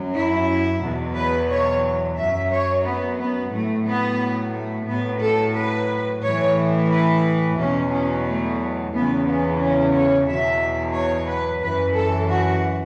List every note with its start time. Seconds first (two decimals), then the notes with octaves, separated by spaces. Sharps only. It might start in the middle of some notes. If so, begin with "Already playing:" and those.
Already playing: F#2 F#3
0.15 E4
0.83 E2 B2 F#3
1.16 B4
1.50 C#5
2.18 F#2 F#3 E5
2.52 C#5
2.86 B3
3.19 B3
3.53 A2 F#3 A3
3.87 B3
4.54 A3
4.88 A2 F#3 B3
5.22 A4
5.55 B4
6.23 A2 E3 C#5
6.90 B4
7.57 E2 B2 F#3 C#4
7.91 C#4
8.25 A3
8.92 E2 C#3 E3 B3
9.26 B3
9.59 C#4
9.94 C#5
10.27 E2 B2 F#3 E5
10.95 C#5
11.28 B4
11.63 F#2 E3 B4
11.96 A4
12.29 F#4